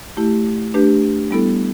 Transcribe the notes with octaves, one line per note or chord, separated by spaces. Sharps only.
A3 E4 G4
A3 D4 G4 B4
G3 B3 E4 A4